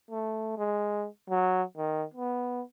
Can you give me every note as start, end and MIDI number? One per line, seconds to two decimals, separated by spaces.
0.11 0.56 57
0.58 1.06 56
1.30 1.62 54
1.77 2.04 51
2.14 2.61 59